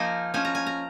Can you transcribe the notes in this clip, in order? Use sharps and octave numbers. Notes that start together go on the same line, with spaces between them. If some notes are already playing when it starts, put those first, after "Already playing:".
Already playing: F3 A#3 D#4 G#5
F3 C#4 G#5
A#5
G#5
A#5